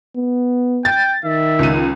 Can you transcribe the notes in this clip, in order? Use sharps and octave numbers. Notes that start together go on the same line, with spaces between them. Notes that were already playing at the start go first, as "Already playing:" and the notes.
B3
G5 A6
D#3 E5
C#2 D#7